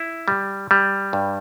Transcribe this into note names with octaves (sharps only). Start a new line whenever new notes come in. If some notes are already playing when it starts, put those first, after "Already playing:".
Already playing: E4
G3
G3
G2